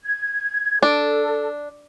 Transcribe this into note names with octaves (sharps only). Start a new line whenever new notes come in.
G#6
D4 A4